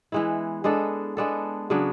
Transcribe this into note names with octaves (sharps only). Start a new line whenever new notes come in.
E3 G#3 B3 E4
G#3 B3 D4 A4
G#3 B3 D4 A4
C#3 F#3 B3 D4